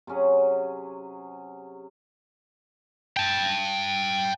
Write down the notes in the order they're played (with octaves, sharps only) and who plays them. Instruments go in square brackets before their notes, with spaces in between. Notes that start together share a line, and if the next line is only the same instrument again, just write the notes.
[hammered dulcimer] C3 F#3 C#4 G#4
[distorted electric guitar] G5 A5